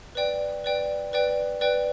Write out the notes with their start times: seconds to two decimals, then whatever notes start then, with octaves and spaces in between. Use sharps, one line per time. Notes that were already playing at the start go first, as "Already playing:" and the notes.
0.15 B4 D5 G5
0.64 B4 D5 G5
1.13 B4 D5 G5
1.61 B4 D5 G5